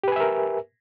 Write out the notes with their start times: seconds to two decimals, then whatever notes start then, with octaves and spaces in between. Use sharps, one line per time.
0.04 G4
0.08 B4
0.12 G#5
0.16 E5
0.20 A#4